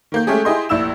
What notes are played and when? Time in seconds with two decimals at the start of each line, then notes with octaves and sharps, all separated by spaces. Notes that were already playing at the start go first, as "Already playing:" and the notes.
0.12 D#3 A#3 G6
0.27 G#3 A3 C#4 G4 G#4
0.45 E4 G4 G#4 D#5 C6
0.69 F1 A#1 E4 E6 E7